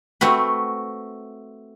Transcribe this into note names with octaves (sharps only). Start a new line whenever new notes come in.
A3 C4 F#4 B4